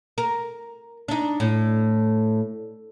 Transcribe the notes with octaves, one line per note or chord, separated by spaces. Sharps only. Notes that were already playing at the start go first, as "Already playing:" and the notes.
A#4
D4 D#4
A2